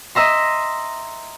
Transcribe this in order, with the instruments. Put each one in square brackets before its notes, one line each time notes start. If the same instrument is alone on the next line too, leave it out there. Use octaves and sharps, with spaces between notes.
[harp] D#5 E5 A#5 C6